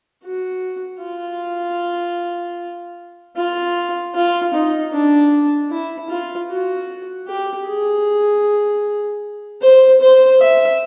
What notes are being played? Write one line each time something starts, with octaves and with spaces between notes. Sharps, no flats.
F#4
F4
F4
F4
D#4
D4
E4
F4
F#4
G4
G#4
C5
C5
E5